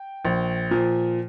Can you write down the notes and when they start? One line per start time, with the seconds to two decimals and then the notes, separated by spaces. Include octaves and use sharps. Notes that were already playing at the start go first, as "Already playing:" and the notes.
Already playing: G5
0.25 A#1
0.71 A#2 F3